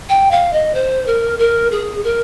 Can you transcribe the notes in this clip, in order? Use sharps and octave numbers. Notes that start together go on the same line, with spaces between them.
G5
F5
D#5
C5
A#4
A#4
G#4
A#4